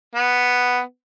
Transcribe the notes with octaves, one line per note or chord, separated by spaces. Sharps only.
B3